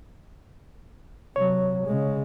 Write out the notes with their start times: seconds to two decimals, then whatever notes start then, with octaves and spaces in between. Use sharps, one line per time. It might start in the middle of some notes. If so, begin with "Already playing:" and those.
1.36 C3 F#3 C#5
1.87 C#3 G#3